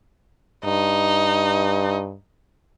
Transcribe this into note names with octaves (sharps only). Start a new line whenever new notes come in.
G2 D#4